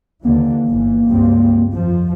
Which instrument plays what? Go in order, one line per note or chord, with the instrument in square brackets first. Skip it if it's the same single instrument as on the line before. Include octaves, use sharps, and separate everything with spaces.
[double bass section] D#2 D3 E3 [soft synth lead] A#3
[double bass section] G1 E3
C#2 G2 C4
F2 F3